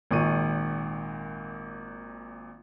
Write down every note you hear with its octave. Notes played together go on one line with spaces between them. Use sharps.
G#1 A#2 C#6 D#7